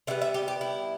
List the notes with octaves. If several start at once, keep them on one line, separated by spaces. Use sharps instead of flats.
D3 G3 B3 E5
E5
G4
G4
E4